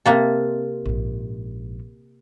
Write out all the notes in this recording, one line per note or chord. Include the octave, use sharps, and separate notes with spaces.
C3 A#3 A4
A#1 G#2